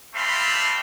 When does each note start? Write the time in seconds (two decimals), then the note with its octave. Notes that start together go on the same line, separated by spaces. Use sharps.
0.15 G3 A3 C4 F5 B5 C6